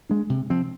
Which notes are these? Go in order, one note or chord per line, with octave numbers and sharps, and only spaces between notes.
G#3 D4
C3
F3 C4